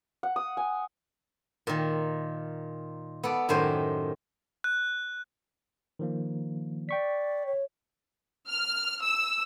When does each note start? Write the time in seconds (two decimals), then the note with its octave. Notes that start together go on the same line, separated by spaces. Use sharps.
0.23 F#5
0.36 D#6
0.57 G#5
1.67 A#2 D#3
3.23 B3 A4 D5
3.49 F#2 A2 D#3 G4 C5 G#5
4.64 F#6
5.99 D#3 F3 A#3
6.89 D5 G5 C#6 B6
7.46 C#5
8.47 F6
9.01 E6